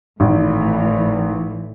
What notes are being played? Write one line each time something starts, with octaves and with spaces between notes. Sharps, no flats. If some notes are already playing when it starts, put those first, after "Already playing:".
G#1 A2 E3